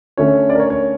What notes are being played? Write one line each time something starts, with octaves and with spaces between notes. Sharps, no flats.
D3 A3 C#4 C#5
D5
A#4
C#5
C#5